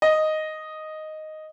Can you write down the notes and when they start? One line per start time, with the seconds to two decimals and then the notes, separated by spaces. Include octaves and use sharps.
0.02 D#5